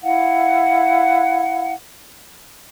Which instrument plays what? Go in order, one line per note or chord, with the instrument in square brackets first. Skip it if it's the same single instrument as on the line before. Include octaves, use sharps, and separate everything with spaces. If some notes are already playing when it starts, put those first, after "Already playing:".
[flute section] E4 F5 F#5